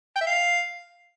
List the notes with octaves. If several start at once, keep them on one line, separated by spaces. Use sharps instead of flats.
G5
E5
F5